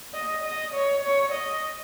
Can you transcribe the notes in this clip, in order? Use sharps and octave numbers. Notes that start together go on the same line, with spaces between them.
D#5
D#5
C#5
C#5
D#5